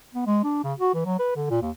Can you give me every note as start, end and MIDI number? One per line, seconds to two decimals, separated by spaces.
0.14 0.26 59
0.26 0.40 56
0.44 0.61 62
0.64 0.73 49
0.79 0.93 66
0.94 1.05 52
1.06 1.18 54
1.19 1.31 71
1.36 1.50 50
1.50 1.61 46
1.62 1.71 39